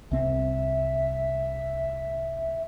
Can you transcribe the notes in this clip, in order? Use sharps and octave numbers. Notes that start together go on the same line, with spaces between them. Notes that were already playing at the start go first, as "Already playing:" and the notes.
C2 C4 E5